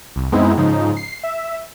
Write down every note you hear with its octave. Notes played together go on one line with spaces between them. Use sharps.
C2
F#2 G#3 B3 C4 D#4 E4
G#2 C#3 F3 D#4
C7
E5